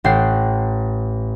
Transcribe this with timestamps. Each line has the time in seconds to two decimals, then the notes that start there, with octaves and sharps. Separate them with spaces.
0.04 A1 F#5 G5 C7